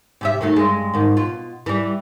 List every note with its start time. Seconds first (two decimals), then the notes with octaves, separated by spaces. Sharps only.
0.21 C3 G4 E5
0.41 D#3 F#3 A3
0.56 G2 G#3
0.94 G#2 D#3
1.17 B2 F4
1.66 E3 G3